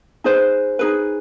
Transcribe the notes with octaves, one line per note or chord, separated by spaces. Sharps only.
D#4 G#4 B4 C5
D#4 G#4 B4